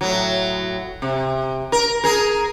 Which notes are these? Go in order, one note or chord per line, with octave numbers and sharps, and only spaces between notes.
A2 F#3
C3
A#4
G#4 A#4